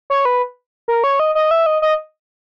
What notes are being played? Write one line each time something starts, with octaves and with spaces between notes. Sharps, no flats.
C#5
B4
A#4
C#5
D#5
D#5
E5
D#5
D#5